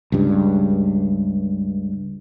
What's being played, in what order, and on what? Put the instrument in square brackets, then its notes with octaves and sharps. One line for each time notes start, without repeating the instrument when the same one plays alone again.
[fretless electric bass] C#2 G2